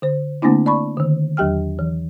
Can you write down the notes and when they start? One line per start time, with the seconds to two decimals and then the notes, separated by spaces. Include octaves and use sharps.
0.02 D3 C5
0.42 D3 A3 A#3 C4 D4 E4
0.66 D5 A5 B5 C#6
0.97 D3 D#3
1.37 E2 F#3 G4 G5 F6
1.79 E3